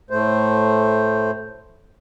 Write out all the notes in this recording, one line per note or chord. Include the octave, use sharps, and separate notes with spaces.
A2 A3 C5